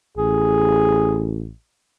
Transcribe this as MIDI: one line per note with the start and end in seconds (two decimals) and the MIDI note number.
0.18 1.52 33
0.18 1.30 68